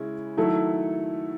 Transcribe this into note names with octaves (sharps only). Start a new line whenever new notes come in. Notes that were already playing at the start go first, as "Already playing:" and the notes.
Already playing: C#3 G#3 C#4 E4
D#3 F#3 A3 E4 A4